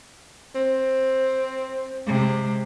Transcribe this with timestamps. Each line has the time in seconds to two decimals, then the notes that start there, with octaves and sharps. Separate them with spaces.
0.55 C4
2.07 C3 G#3